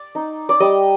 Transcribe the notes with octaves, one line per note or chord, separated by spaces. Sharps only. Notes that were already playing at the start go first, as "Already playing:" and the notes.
Already playing: D5
D#4
D5
G3 D#5